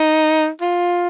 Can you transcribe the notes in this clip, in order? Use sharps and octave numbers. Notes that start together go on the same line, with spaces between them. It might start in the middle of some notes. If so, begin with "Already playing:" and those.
Already playing: D#4
F4